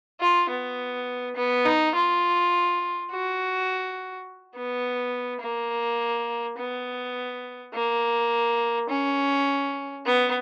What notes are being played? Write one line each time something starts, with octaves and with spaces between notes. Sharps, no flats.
F4
B3
B3
D#4
F4
F#4
B3
A#3
B3
A#3
C#4
B3